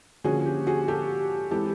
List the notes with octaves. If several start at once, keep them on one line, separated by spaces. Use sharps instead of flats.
D3 F3 A#3 C#4 F#4 G#4
G4
F#4 G#4
G4 A4
E3 G#3 C4 G4 A4